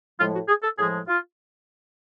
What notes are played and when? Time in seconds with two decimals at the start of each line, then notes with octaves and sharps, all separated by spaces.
0.19 A2 F3 G#3 F4
0.34 F#4
0.48 G#4
0.62 A4
0.78 A2 F3 G#3 G#4
1.08 F4